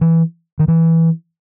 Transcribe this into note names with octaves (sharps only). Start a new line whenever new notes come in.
E3
D#3
E3